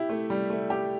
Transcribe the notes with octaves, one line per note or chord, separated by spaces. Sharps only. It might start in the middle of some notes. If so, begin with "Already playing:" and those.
Already playing: E4 G4
A3
G3
A3
G4